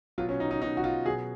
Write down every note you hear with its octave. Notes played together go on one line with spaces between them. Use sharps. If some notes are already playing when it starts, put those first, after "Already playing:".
B2 F#3 F4
C#4
D#4
D#4
B2 F#3 D#4
F#4
F4
B2 F#3 G#4